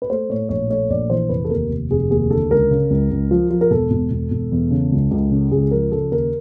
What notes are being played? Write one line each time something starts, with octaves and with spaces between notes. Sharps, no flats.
B4
A3 C5
A2 C#5
A#1 C#5
A3 C#5
A#1 D5
E3 C5
F1 B4
A4
D#2 A#4
F1
F1 G#4
D#2 G#4
D3 A4
C#2 A#4
C#3
C#2
C#2
F3
F3
A#4
E1 A4
E1
E1
E1
E2
C#3
C#2
C#2
C#3
C#2 G#4
F3 A#4
C#3 A4
D#2 A#4